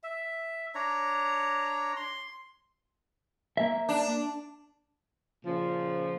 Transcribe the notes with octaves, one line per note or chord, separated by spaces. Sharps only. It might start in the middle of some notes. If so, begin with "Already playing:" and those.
E5
D4 C#5 A#5
C6
A#3 E5
D4
A#2 C#3 F3